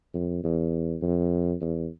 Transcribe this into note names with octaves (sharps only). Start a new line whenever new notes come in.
F2
E2
F2
E2